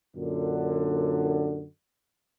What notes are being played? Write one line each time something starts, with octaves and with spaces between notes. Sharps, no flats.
F#2 A#2 D3